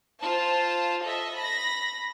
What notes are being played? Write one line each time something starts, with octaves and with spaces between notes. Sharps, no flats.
F4 C5 A5
A4 D#5 E5
B5 A#6